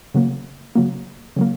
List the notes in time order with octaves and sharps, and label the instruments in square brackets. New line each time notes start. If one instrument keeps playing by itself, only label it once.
[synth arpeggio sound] C#3 F#3 A#3
C#3 F#3 A#3
C#3 F#3 A#3